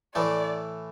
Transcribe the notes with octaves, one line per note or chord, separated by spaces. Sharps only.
A2 E3 A3 D5